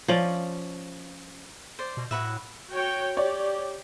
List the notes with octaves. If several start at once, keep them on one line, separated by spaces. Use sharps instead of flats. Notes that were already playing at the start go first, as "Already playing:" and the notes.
F3 C#4 D5
C5 D5
B2
A2 F#4 B4 E5
F#4 C#5 G5
G4 C#5 D5